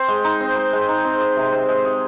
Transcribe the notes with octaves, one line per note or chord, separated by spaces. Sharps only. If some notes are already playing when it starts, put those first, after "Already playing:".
Already playing: C4 C5
G#3
D#4
C4
C5
G#3
D#4
C4
G#4
C3
C4
G#3
G#4